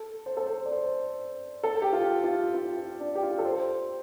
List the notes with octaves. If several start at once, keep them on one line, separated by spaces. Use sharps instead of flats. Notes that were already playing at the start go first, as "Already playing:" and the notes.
Already playing: A4
C5
A4
C5
D5
C5
A4
G4
F4
F4
F4
F4
D4
G4
F4
A4
C5